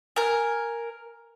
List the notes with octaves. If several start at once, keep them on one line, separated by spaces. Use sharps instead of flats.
A#4 G#5